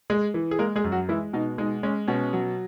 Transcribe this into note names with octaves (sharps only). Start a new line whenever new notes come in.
G#3 G#4
E3
G#4
G#3 A#3 A#4
G#3 G#4
F#2
F#3 F#4
E3 G#3 E4
B2 D#4
G#3 D#4
G#3 C#4
B2 C#4
F#3